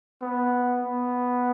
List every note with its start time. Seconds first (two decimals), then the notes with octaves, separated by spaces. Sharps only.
0.22 B3
0.82 B3